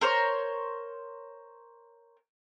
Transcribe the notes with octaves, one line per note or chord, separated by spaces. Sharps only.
A#4 C5 C#5